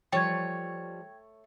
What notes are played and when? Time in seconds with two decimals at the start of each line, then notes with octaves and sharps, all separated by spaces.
0.12 F3 G3 A3 C#5 G5 G#6